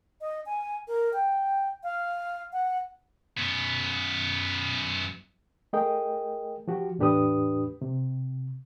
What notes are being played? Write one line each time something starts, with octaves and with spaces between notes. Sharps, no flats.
D#5
G#5
A#4
G5
F5
F#5
F#2 B3
A3 G#4 A#4 D#5 G5
F3 F#4 G4
E2 A2 D4 G4 B4 D#6
C3